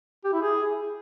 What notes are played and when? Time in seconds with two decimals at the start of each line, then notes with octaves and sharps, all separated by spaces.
0.24 G4
0.33 E4
0.42 G#4